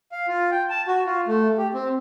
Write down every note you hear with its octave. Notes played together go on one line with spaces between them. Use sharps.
F5
F4
G5
A5
F#4
F4
A3
G4
C4